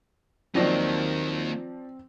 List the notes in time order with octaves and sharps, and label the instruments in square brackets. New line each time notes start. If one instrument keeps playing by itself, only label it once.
[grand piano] D#3 F#3 [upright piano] F3 D5 [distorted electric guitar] A#3 D#4 [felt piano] C4 A#6